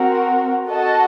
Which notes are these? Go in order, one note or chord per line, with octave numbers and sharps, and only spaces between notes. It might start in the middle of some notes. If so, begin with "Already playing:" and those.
Already playing: C4 F#4 A#4
F#4 A4 D#5 A5